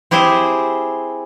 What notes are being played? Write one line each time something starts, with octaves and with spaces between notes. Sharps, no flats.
C4 E4 G4 G#4 C5 E5